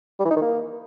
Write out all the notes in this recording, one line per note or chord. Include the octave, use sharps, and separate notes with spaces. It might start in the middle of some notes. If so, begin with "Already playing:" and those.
G3
E3
D#4
D#3
A#3